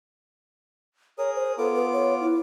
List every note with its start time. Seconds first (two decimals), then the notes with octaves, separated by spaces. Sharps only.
1.18 G#4 A#4 C#5 D#6
1.35 C5
1.58 B3 F4 A4 D6
1.75 B4
1.93 C#5
2.21 E4